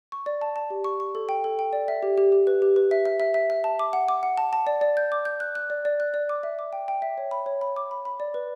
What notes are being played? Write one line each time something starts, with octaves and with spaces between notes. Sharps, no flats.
C#6
D5
A5
A5
G4
C#6
C#6
A4
G5
A4
G5
D5
E5
G4
G4
G4
B4
G4
B4
E5
E5
E5
E5
E5
A5
D6
F#5
D6
F#5
A5
A5
D5
D5
G6
D6
G6
F#6
F#6
D5
D5
F#6
D5
D6
E5
D6
G5
G5
E5
C#5
B5
C#5
B5
D6
B5
B5
D5
B4